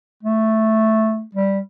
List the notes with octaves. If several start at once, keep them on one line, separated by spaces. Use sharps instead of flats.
A3
G3